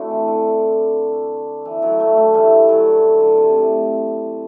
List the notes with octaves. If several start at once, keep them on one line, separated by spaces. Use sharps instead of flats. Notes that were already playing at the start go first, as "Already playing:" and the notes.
Already playing: A3 C4 D4 E4 F#4
E3
D3
E3
D3 F#3
F#3 A3
F#3 A3
E3 G3
D3 F#3
D3
C3
A2